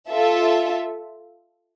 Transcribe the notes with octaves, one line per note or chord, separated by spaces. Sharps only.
F4 A4 E5